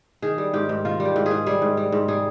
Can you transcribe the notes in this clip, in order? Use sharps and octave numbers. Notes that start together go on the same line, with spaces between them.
D#3 G#4
G3
G#2 G4
G#2
D#3 F4
G3
G4
G#2
G#4
G#2
G3 G#4
G#2
G3
G#2
G3 G#4